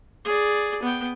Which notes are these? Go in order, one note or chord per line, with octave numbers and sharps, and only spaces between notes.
G#4 D5
B3 G5